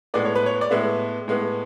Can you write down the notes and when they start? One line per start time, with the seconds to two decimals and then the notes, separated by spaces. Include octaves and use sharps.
0.14 A2 G#3 B3 D5
0.25 C#5
0.35 B4
0.46 C#5
0.61 D5
0.71 A2 G#3 B3 E5
1.28 A2 G#3 B3